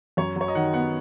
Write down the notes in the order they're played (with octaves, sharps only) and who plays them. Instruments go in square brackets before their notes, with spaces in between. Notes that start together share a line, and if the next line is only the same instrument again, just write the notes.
[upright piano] F#2 [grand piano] C#5
[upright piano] F#3 [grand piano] C#5
[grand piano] D#5
[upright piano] D#3 [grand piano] F#5
[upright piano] B3 [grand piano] F#5